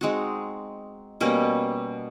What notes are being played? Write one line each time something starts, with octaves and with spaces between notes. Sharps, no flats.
G#3 C4 D#4 F#4
B2 G3 A#3 C#4